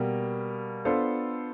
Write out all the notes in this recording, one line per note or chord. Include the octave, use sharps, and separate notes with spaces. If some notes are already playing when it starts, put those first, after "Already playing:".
Already playing: B2 G3 A#3
B3 D4 F4 A4 C5